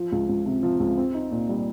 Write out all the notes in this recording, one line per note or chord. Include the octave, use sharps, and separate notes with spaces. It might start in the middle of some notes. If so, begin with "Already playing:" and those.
Already playing: F3
C#2
C#2
C3
F3
C#2
C4
D#4
A#2
G3